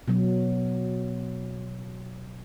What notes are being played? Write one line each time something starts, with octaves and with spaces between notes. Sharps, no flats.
B2 F#3